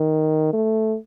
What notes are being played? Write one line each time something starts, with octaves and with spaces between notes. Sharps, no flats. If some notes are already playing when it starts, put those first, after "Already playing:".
Already playing: D#3
A3